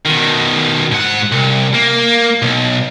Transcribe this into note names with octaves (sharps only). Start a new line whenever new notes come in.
B2 D#3
G#2 F#5
C2
A#3
B1